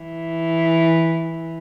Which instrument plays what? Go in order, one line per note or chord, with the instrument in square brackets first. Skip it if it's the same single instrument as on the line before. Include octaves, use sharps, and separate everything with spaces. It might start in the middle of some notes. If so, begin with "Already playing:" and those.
Already playing: [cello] E3